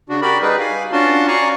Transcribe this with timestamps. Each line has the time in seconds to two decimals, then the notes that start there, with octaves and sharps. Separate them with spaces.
0.09 C#3 D4 F#4
0.22 F#4 G4 A#4 D5 B5
0.42 G3 D#4 G#4 B4
0.60 F5 G#5
0.92 C#4 D4 F4 F#4 A5 C6
1.28 D5 F5 G#5 A#5 C#6